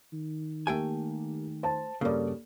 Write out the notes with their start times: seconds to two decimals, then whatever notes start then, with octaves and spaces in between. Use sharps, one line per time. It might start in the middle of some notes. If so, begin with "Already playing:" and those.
0.13 D#3
0.67 A3 A#3 G4 G5 G#5
1.63 C5 A5
2.01 G2 C#3 A#3 A4 D5